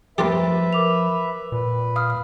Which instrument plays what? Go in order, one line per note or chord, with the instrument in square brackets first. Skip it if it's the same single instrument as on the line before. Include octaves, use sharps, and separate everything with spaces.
[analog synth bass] F3 [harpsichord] A#3 F4 G4 [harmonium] B4 E5 [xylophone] A6
[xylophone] A#4 D6 F7
[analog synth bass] A#2 [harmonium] B4
[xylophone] F5 D#6 F6